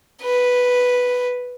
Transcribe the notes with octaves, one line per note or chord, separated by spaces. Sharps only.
B4